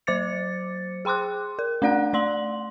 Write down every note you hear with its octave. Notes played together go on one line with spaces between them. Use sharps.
F#3 C5 D6 A6 C#7
G#4 G5 C6 D6 F#6
A#4
A3 D4 D5 F#5 F#6
A3 D5 C6 F#7